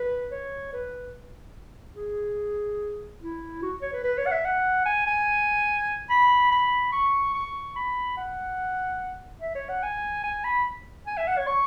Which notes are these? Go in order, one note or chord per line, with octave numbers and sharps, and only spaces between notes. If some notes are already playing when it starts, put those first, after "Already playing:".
Already playing: B4
C#5
B4
G#4
E4
F#4
C#5
B4
B4
C#5
F#5
E5
F#5
G#5
G#5
B5
B5
C#6
C#6
B5
F#5
E5
C#5
F#5
G#5
G#5
B5
G#5
E5
F#5
C#5
C#6